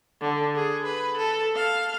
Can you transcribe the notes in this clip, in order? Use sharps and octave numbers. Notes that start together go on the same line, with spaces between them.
D3
G#4
B4
A4
F5